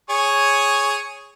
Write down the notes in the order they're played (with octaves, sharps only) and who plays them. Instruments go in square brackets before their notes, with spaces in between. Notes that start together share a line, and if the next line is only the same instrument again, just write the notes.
[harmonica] G#4 C#5 C#6